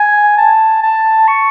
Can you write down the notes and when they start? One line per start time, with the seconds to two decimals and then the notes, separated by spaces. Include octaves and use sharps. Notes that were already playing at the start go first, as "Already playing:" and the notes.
Already playing: G#5
0.38 A5
0.83 A5
1.28 C#6